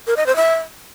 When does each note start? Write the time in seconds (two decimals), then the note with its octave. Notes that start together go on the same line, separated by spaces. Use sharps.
0.07 A#4
0.17 D#5
0.26 C5
0.36 E5